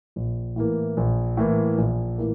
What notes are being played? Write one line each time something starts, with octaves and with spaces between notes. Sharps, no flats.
A#1
A2 E3 A#3
A#1
A2 E3 A#3
A#1
A2 E3 A#3